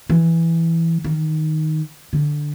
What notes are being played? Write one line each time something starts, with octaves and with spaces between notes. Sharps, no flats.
E3
D#3
D3